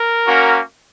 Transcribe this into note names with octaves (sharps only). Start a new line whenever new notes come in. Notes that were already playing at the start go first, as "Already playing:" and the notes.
Already playing: A#4
A#3 C#4 F#4